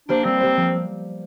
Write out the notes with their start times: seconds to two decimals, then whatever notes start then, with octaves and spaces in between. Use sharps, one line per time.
0.08 A#3 D4 G4 C5
0.24 G3 C4
0.40 A#3 G4 C5
0.57 F3